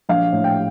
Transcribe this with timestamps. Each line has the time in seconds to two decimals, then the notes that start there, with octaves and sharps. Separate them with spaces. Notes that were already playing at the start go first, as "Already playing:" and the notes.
0.09 A#1 F5
0.32 A2
0.44 G5